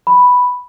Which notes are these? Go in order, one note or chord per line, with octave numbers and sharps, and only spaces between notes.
B5